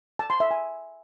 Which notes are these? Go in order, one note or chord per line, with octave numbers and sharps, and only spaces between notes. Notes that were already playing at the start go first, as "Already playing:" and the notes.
A5
C6
E5
G#5